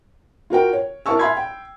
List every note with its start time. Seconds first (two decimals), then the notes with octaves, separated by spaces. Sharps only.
0.50 F4 F#4 A#4 G5
0.73 C#5
1.06 E4 A#4 F5 A5 C#6 E6
1.19 E5 F5 G#5 B5 C6 G#6
1.37 G5